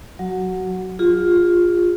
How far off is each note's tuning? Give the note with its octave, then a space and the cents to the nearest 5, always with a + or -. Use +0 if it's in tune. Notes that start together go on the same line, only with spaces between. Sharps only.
F#3 -10 F#4 +15
F4 +10 G#4 -40